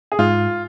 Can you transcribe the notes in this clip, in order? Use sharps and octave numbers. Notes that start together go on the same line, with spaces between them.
G#4
G#2 F4